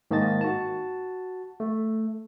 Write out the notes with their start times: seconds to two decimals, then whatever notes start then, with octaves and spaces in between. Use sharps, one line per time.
0.11 G#2 D#3 A#3 D#5 A5 A6
0.41 F#4 A5
1.60 A3